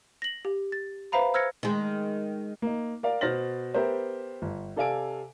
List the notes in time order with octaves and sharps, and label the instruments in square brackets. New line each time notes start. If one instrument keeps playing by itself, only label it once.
[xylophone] A#6 F#7
G4
A6
B4 C5 E5 F5 A#5 B5
C5 E6 F6 G#6 A#6 C#7
[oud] D#3 G#3
[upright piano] A#3 D#4
A#4 D5 F5
B2 C5 F6 A6 A#6 F#7
B3 G4 A#4 C5 E5
G1
C3 A4 D5 F5 G#5 D7